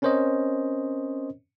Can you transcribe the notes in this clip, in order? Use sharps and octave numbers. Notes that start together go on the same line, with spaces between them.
C4 C#4 A#4 C5 C#5 D#5